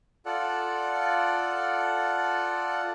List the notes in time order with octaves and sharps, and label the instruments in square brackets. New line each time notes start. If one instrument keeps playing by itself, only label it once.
[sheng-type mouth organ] F4 A4 D5 F#5